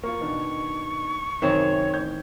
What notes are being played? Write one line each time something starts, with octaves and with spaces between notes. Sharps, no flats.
A#3 F4 C#6
B2 D#3 D4
F#2 C3 D#3 C4 C#5
A1 G6 G#6